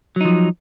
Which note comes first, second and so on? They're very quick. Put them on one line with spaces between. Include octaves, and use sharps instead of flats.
F#3 D#4 F3